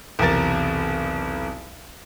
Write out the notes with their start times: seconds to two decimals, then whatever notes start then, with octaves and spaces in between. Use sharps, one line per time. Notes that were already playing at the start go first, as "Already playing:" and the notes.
0.19 B1 E2 C3 A#4 A6